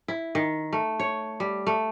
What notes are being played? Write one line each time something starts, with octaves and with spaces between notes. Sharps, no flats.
E4
D#3
A3
C#5
G3
A3